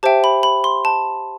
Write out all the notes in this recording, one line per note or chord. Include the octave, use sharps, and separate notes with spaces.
G4 C5 E5 G5 A5
B5
B5
C6
A5